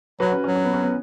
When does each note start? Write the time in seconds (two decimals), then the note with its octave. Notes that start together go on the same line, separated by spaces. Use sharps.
0.20 F#3 F#4 B4
0.32 C#4
0.44 F#3 C#4
0.56 C#4
0.65 B3
0.74 C#4
0.82 B3